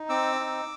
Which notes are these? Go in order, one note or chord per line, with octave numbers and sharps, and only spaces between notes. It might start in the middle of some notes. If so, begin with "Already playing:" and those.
Already playing: D#4
C4 D6 E6
D#4